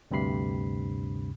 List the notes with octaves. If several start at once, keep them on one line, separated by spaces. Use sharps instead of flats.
D2 G2 C3 B5 C7